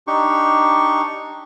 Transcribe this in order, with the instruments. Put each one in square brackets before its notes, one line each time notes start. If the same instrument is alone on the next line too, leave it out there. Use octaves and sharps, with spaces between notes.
[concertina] D4 D#4 G4 C#6